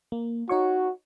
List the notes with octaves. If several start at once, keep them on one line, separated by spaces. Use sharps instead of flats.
A#3
D#4 F#4 C#5 C#6